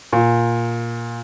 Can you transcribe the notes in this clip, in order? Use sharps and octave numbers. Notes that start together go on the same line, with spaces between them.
A#2